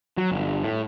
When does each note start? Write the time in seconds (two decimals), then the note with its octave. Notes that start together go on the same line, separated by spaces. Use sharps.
0.17 F#3
0.32 G1
0.64 A2